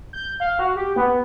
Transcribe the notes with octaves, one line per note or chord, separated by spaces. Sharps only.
G6
F5
F#4
G4
B3